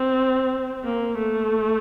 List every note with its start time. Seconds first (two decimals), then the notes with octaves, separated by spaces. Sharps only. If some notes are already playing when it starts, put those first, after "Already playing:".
Already playing: C4
0.84 A#3
1.18 A3